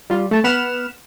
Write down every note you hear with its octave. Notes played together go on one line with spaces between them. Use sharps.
G3 F4
A3 A5
B3 F#5 B5 F6 E7